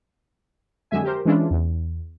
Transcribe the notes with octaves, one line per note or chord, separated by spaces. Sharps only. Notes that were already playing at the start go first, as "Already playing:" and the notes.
F2 D3 F#3 G#3 E5 G#5
G4 A#4 C5
E3 G#3 C#4 D4 E4 F4
E2